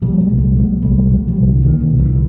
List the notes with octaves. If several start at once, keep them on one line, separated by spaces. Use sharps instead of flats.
A#2 F3 G3
F#3 G#3
C2
G3 A3
A#2 F#3 G#3
C2 G3 A3
A#2 F#3 G#3
F3 G3
C2
D3
A#2 D#3
D#3
C2
D3 E3